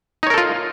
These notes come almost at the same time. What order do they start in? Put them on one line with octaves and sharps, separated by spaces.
D#4 C#5 A#4 A4 F4